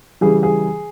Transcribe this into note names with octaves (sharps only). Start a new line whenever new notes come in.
C#3 E3 G3 G#4
G#4